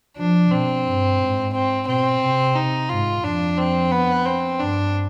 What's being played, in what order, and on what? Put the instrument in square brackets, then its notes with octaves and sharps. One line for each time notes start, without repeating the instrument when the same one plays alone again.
[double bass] F3 [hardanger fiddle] D4
[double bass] B2 [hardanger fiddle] C4
[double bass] G2
G#2
[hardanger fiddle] C4
[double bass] B2 [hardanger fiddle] C4
[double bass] C3
[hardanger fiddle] D#4
[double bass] G#2 [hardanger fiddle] F4
[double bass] F2 [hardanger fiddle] D4
[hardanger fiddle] C4
B3
C4
[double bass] G2 [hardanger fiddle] D4